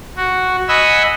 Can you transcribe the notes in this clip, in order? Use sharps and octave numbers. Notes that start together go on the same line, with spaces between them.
F#4
D#5 F#5 G#5 B5 E6